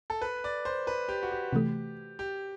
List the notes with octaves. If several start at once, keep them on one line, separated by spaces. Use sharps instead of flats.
A4
B4
D5
C5
B4
G4
F#4
G4
C3 E3 A3
G4